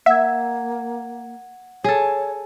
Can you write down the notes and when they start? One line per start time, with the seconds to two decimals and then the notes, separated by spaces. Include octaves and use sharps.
0.06 A#3 E5 F#5 G#6
1.84 G#4 A4 C#5